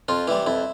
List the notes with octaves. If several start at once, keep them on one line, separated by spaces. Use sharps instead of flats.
F2 F4
E3 G3 E4
F2 E4